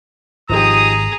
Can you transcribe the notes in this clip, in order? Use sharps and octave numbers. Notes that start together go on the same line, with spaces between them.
G#1 F3 D#4 G4 G#4 A#5 D#6